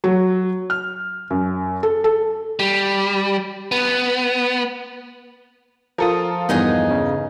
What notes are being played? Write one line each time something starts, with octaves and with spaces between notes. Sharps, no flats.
F#3
F6
F#2
A4
A4
G3
B3
F3 F4 A4 A#4 D#6
E2 G2 B3 D#4 G#4
C#3